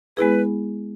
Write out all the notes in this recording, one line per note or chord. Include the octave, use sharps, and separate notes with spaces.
G#3 B3 E4 G#4 B4